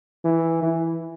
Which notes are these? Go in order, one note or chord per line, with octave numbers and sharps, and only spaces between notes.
E3
E3